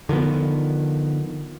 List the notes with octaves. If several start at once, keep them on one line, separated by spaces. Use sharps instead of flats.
D3 D#3 F3 B3